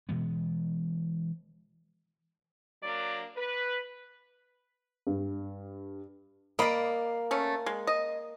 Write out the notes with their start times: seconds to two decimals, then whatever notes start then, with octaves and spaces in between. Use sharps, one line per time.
0.09 B2 E3 G#3 B3
2.83 F#3 A#3 D4 D5
3.37 B4
5.07 G2
6.59 A#3 D5 D#5 B5
7.31 A3 C#4
7.66 G#3
7.87 D#5